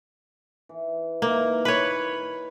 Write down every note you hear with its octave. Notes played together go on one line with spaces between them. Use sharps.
E3
E3 A#3 D#4
B4 C#5